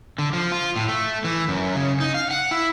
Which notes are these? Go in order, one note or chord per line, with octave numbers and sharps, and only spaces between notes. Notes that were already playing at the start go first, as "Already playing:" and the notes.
D3
F3
F4
A2
A3
E3
F#2
C#3
D#4
F5
F#5
E4